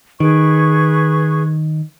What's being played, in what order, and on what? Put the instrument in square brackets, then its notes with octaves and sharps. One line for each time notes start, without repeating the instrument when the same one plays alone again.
[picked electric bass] D#3 [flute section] G#4 B4 C#6